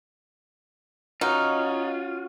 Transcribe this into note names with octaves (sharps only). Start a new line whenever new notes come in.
C#4 D#4 F4 F#4 F5